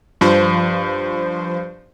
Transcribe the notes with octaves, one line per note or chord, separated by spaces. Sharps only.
G2 F3 C5